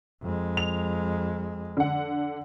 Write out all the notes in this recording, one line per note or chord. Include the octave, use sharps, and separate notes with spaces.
F2 G#3
F7
D3 F#5